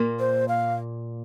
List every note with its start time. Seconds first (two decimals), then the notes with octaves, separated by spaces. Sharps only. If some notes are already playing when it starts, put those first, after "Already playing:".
Already playing: A#2 A#3
0.20 C5
0.48 F5